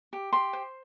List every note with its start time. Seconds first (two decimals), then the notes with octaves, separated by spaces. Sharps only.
0.13 G4
0.33 G4 C6
0.53 C5